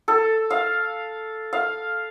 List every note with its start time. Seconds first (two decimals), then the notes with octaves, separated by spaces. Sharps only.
0.08 A4
0.50 F5
1.53 F5